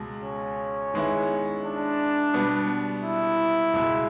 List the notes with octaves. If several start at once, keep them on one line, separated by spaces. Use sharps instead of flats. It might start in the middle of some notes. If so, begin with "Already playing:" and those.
Already playing: C#2 B2 G#3
C#4
D#3 G#3 B3 E4
D4
B2 G3 B3
E4
C#2 B2 G#3